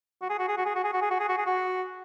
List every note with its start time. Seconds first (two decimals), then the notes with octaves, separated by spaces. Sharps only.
0.21 F#4
0.30 G#4
0.39 F#4
0.48 G#4
0.57 F#4
0.66 G#4
0.75 F#4
0.84 G#4
0.93 F#4
1.01 G#4
1.11 F#4
1.19 G#4
1.28 F#4
1.38 G#4
1.46 F#4